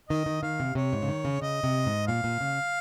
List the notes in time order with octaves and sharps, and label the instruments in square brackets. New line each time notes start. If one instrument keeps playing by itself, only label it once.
[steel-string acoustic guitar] D#3 [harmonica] D#5
[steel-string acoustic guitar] D#3
[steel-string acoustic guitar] D#3 [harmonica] F5
[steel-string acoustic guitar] C3
[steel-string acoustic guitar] C3 [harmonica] C#5
[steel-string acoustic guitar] G#2
C#3
D#3
C#3
[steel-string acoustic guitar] C#3 [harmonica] D#5
[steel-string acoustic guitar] C3
G#2
[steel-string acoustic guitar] A#2 [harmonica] F5
[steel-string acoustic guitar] A#2
C#3